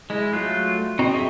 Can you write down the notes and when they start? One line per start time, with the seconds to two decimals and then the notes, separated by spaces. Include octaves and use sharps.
0.10 G#3 E4 D#5
0.33 F#3 A3 F4 F#6
0.99 C4 F#4 D#5 A#5
1.13 G#4 D#5 E5